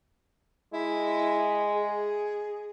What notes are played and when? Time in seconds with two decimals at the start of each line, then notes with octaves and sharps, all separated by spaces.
0.73 G#3 E4
1.74 G#4